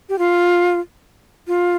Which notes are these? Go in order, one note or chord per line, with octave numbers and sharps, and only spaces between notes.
G4
F4
F4